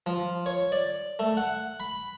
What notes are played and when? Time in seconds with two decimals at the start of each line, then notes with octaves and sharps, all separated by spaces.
0.06 F3
0.46 C#5
0.72 D5
1.19 A3
1.37 F#5
1.80 B5